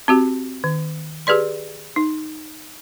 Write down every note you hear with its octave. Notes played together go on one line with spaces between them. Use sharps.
C4 F#4 G4
D#3
G4 G#4 B4 D5 C6
D#4